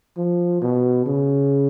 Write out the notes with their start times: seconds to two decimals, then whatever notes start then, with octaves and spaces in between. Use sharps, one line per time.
0.17 F3
0.61 B2
1.06 C#3